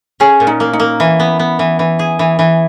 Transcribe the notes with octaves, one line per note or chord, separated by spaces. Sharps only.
C#4 G#4
A#2
D#4
A#3
D#4
A#3
E3
B3
B3
E3
E3
G#4
E3
E3